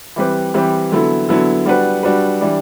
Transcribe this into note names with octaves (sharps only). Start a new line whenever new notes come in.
E3 G3 C4 G4 B4
E3 G3 C4 G4 B4
D3 F#3 B3 E4 A4
D3 F#3 B3 E4 A4
G3 D4 F#4 B4
G3 D4 F#4 B4
E3 G3 D4